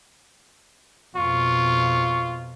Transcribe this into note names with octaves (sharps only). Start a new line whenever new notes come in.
F2 B2 F4 C#6